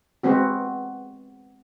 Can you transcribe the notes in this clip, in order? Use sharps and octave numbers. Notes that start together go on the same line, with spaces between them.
G#3 B3 C4 F#4